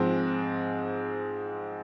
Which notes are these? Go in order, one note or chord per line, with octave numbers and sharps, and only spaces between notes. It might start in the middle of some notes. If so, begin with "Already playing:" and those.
Already playing: G#2 F3 G#3 C4